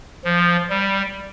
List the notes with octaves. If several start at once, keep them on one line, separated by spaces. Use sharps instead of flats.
F3
G3